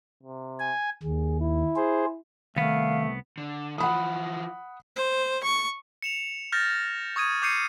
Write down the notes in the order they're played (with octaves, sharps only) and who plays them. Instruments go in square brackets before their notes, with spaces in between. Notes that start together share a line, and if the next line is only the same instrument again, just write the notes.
[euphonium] C3
[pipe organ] G#5
[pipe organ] D#2 [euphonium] G#4
[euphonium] E4
[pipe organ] G#4 C5
[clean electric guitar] C2 B3 [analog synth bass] D#3 [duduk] A3 [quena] F5
[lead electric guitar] D3
[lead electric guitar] E3 F3 [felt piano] F#5 B5 D#6
[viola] C5
C#6
[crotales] C#7 E7 F7
F6 G6 A6 A#6
C#6 D#6 G#6 D#7
D6 G6 C7 C#7 D#7